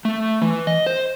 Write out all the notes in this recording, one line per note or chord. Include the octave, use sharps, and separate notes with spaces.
A3
E3
D#5
C5